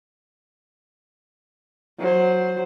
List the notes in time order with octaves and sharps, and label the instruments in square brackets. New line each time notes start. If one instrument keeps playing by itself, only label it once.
[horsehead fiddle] F#3 C5